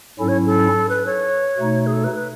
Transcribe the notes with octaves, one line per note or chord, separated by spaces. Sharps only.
G#2 F#3 C#4 E4 A4
C#5
A4
B4
C#5
B2 A3 D#4
G#4
A4
B4
B4